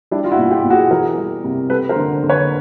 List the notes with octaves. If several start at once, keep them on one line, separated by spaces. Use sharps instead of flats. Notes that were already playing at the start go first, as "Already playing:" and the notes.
G3 D4 E4
F4
E4 F#4
B2
F4 G4
B2
F#4 G#4
E3 G#4 A#4
G3
C3
G3 A4 B4
A#4 C5
D3
D3
B4 C#5